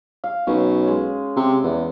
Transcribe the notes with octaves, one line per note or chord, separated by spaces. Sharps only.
F5
B1 C#4
G#3
C3
E2